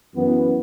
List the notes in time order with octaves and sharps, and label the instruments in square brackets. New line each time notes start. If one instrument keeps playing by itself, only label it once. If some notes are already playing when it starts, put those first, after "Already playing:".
[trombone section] F#2 E3 B3